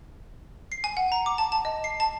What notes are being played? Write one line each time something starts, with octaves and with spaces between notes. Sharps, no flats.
C7
G#5
F#5
A#5
D6
A5
A5
D#5
C7
A5